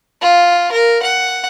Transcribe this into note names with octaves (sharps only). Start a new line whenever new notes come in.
F4
A#4
F#5